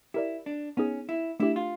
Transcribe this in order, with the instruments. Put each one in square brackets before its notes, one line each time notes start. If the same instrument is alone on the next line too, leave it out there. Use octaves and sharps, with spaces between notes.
[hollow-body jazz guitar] E4 [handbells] G4 A#4 D5
[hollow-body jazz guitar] D4
[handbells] B3 D#4 G#4 [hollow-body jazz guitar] C#4
[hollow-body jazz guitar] E4
[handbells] A3 D4 G4 [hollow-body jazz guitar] E4
[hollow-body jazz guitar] F4